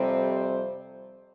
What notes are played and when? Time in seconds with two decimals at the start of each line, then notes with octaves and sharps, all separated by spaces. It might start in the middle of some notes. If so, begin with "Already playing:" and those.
Already playing: F2 C3 G3 C4
0.24 C5